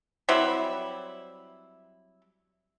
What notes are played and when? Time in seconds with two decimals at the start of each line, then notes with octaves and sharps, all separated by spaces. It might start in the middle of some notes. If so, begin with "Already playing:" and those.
0.29 F#3 G3 C4 E4